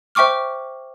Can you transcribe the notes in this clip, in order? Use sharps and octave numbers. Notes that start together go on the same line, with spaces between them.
C5 E5 G5 C#6 D6 F6